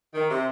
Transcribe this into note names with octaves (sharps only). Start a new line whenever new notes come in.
D#3
C3